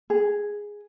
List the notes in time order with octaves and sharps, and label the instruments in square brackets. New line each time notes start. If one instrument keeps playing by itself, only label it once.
[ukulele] G#4